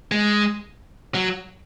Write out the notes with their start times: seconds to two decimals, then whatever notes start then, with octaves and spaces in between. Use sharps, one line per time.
0.12 G#3
1.15 F#3